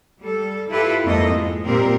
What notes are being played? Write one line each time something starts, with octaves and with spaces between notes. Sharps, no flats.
G3 A4
E4 F4 G4 A4 B4
F2 G#2 F3 A#3 A4 D#5
G#3
A#2 G3 C4 G4 A#4